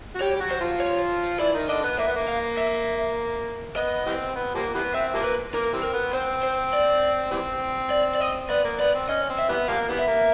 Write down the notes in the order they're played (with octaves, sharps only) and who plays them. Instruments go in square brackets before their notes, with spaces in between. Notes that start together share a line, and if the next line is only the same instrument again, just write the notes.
[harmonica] F#4
[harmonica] G3 G4 [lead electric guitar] C#5
[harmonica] G4
F#3 F#4
[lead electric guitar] C5
[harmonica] F3 F4
[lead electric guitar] C#5
[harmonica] E3 E4 [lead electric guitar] D5
[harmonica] D#3 D#4
[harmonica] D3 D4 [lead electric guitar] D#5
[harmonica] B3
[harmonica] A#3 [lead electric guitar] E5
[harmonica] B3
A#3
[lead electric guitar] F5
E5
[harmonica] B3 [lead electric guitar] D#5
[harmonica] E3 G3 C4
B3
F3 G3 A#3
E3 G3 B3
[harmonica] C4 [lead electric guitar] E5
[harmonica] F3 G3 A#3
[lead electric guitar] B4
[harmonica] A#3 [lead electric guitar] A#4
[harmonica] E3 G3 C4
[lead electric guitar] A#4
[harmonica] B3
[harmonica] C4 [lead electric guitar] C5
[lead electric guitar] C5
D5
[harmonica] E3 G3 C4
[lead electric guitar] D5
D5
D#5
[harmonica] B3 [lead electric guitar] D5
[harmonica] A#3
[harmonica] B3 [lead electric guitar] D5
[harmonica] C4
[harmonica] C#4 [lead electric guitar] D#5
[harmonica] C4
[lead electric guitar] E5
[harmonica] E3 G3 B3
[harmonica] F3 G3 A#3 [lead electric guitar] F5
[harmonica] E3 G3 B3
[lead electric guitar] E5
[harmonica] A#3